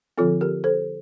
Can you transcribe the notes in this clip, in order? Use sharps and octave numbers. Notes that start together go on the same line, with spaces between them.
D3 F3 C4 F4 A4
G4 A#4
A4 C5